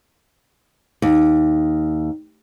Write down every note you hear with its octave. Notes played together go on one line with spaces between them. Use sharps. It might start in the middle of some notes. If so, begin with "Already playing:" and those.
D#2